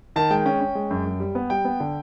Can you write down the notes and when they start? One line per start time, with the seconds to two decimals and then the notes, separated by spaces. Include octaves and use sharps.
0.16 D#3 A5
0.31 G#3 G5
0.45 C#4 G5
0.61 C#4
0.75 G#3
0.91 F#2
1.06 F#2
1.20 G3
1.35 B3
1.50 G3 G5
1.65 B3
1.80 D3